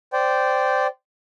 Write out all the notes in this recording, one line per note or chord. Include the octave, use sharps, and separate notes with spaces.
C5 D5 G5